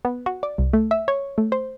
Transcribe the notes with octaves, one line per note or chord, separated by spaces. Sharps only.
B3
F#4
D5
C2
A3
E5
C#5
A3
C5